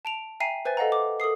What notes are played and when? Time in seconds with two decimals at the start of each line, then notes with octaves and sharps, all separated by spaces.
0.05 A5 D7 F7
0.40 E5 G5 G#5 A#5 C7 D#7
0.65 B4 C5 E5 G#5 A6
0.77 A4 D#5 F5 F#5 A#5
0.92 D6
1.20 A4 A#4 D#6 C7